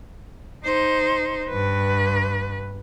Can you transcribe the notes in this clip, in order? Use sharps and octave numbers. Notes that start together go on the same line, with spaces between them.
D#4 C5
G2 B4